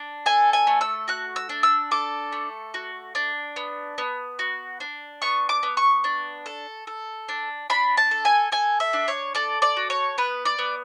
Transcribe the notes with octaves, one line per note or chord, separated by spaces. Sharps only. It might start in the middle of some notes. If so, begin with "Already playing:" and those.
Already playing: D4
A4 G#5
G#5
A3
E6
F#4 F#6
E6
D4
E6
A4 D6
A3
F#4
D4
B3
B3
F#4
D4
B3 C#6
D6
B3
C#6
D4
A4
A4
D4
D4 B5
A5
A4
G#5
A4 G#5
E5
D4
C#5
A4 D5
D5
F#4
C#5
B3 B4
D5
B3